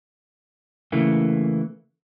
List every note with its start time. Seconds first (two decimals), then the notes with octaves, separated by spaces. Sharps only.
0.92 C#3 E3 A3 A#3